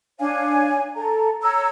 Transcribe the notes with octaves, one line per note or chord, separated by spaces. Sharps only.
D4 C#5 F5 G#5
A4 A#5
C#5 A#5 E6